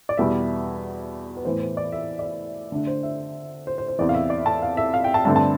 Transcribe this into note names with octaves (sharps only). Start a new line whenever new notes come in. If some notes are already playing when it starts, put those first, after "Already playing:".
D5
E2 B2 G3 E5
B4
A2 E3 B3 C5
C5
D5
E5
D5
E5
D3 A3 D4
C5
E5
C5
C5
C5
E2 C3 E3 D5
F5
E5
D5
A5
F5
E5
F5
G5
A5
G2 D3 A3 C4 A5
A5